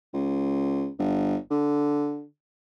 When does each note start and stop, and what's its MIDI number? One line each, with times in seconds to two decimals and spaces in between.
0.14 0.87 37
0.99 1.36 31
1.51 2.24 50